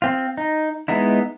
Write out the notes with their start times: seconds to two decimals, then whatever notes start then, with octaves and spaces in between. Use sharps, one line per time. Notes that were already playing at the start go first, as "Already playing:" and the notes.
0.02 C4 F4
0.37 D#4
0.88 G#3 B3 D#4 E4